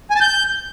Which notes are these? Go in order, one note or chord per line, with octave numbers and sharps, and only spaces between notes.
G#5
A5
G6